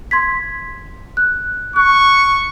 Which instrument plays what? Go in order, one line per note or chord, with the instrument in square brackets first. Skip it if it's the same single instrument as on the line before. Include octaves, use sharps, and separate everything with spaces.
[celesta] C6 G#6 B6
F#6
[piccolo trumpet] C#6 [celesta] F#6